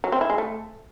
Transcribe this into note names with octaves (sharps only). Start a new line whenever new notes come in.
F#3
C4
E4
G#3
A3